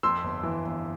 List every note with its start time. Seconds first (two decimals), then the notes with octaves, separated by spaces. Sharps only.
0.03 F2 C6 E6
0.24 G1
0.43 E3
0.65 G1